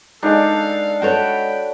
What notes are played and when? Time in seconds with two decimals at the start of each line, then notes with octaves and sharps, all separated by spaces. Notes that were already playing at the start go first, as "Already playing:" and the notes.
0.23 G#3 D4 D#4 A4 F5 G#5
1.02 F#4 A4 C#5 G5 B5